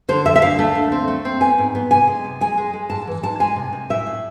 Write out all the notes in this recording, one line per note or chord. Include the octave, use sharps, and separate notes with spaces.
D3 C5
F2 E5
E5
D2 F5
A3
D2
C4
A3
C4
B3 G#5
G#2
B3
C3 G#5
G#3
C3
G#3 G#5
G#3
G#3
G#2 A5
E3
G#2 A5
G#3 G#5
C3
C3
A2 E5
A2